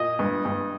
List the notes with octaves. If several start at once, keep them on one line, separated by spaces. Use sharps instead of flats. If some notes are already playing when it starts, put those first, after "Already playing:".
Already playing: A#2 D#5
G2
G2